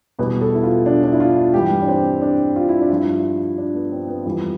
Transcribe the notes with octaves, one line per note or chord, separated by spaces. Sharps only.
E2 B2 G3 B4
A4
E4
F4
D4
D4
E4
F4
G2 E3 G3 G4
D4
C4
D4
F4
E4
D4
G2 F3 E4
D4
B3
C4
B3
F2 E3 G3 B3